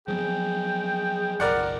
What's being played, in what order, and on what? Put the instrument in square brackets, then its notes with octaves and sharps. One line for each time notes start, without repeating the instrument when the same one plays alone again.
[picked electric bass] F3 F#3 B3 [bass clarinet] G#4 [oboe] G5
[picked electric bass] F#1 B1 [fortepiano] A#4 D5 F#5